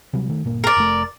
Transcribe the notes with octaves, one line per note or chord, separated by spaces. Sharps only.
C3 F#3 G3
D#3 A3
G1 A#2 A#3
A#4 D5
F1 A3